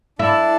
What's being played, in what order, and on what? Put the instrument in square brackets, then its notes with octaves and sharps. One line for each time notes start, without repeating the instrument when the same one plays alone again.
[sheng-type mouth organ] D4 A4 D5 A5 [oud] E4